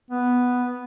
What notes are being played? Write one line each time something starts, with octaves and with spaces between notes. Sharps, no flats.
B3